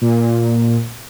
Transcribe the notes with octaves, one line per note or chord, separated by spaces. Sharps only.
A#2